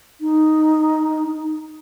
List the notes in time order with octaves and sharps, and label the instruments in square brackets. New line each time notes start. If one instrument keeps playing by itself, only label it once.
[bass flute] D#4